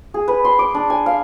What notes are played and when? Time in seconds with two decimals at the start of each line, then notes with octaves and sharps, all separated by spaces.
0.14 G#4
0.28 B4
0.45 C6
0.59 D6
0.74 D4
0.90 G#5
1.06 F5